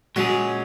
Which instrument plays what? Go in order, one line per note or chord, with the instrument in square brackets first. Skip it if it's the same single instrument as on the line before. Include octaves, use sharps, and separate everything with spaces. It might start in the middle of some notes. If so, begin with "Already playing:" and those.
[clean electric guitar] A#2 G#3 C#4 G#4 [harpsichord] F#3